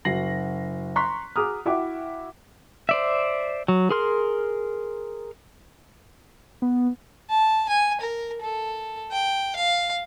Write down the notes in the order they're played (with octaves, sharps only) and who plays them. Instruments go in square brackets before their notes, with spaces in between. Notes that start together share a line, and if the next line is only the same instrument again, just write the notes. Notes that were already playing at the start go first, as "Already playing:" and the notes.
[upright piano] F#1 F#4 A#6 C7 F#7
A#5 C6 C#6 F#6 B6
F#4 G#4 A#5 D6 D#6 F6
E4 F#4 E5 F#5 G5 D6
[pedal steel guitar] C5 D5 E5
F#3
G#4 A#4 C6 F6
[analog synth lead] B3
[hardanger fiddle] A5
G#5
A#4
A4
G5
F5